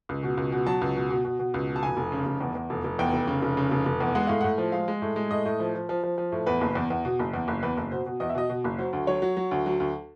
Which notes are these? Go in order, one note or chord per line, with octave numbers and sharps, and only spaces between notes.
C#2
B2
C#2
B2
F#3 A5
C#2
B2
B2
B2
B2
C#2
B2
A5
F1 G#5
F1
C#3
F1
E2
E2
F1
F1
E2 G5
F1
C#3
F1
C#3
F1
F1
E2
G#3 F#5
A2 F5
A2 F#5
F3
G#3 F5
G#3
A2
G#3
A2 D#5
A2
F3
F3
F3
F3
F3
A2
E2 B4
F#1
E2
E2
B2
F#1
E2
F#1
E2 B4
F#1
B2 C5
B2
E2 D#5
E5
B2 D#5
B2
F#1
F#3 C5
D2
F#3 C#5
F#3
F#3
D2
F#3
D2